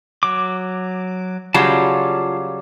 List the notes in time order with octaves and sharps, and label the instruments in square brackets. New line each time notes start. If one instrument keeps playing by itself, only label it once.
[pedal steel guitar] F#3 D6
[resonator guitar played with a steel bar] C#3 F#3 G3 [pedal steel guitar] F4 F5 A5